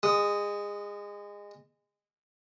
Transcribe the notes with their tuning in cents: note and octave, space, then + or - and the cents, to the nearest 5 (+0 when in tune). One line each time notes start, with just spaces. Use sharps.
G#3 -25 D#6 +0